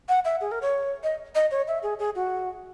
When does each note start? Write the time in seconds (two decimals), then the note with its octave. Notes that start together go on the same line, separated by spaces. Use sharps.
0.09 F#5
0.25 E5
0.41 G#4
0.52 A#4
0.62 C#5
1.03 D#5
1.35 D#5
1.51 C#5
1.68 E5
1.83 G#4
1.99 G#4
2.15 F#4